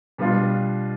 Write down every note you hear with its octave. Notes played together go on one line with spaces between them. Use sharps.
B2 G3 B3 D4 F4